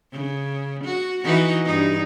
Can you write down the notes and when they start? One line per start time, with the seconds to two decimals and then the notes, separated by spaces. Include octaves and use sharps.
0.12 C#3
0.84 F#4
1.24 E3 D#4 F#4
1.66 G2 D#4